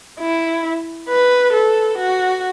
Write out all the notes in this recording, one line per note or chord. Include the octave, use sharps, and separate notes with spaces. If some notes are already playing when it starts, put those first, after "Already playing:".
E4
B4
A4
F#4